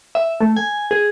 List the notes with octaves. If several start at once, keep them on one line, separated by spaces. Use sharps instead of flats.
E5
A3
G#5
G#4